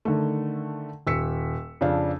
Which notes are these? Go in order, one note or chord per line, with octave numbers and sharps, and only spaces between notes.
D3 D#3 A3
D#1 E6 B6 C#7
F2 C#3 D4 F5